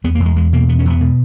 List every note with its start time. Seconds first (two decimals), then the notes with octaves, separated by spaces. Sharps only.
0.04 E2 B3
0.15 A#3
0.20 E2
0.25 G#3
0.36 E2 G#3
0.53 B2 A#3
0.69 E2 B3
0.79 C#4
0.85 E2 B3
1.01 B2